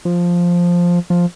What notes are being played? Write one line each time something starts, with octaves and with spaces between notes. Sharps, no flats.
F3
F3